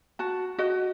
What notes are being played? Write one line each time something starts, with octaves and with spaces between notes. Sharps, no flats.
F#4 A5
F#4 D#5